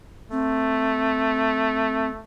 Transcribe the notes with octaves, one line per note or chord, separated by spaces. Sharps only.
A3 C4